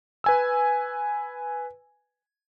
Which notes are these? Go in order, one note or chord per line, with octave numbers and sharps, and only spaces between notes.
B4 G#5 E6